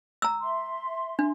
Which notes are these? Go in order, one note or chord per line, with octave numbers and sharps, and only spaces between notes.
A#5 E6
E5 C6
D4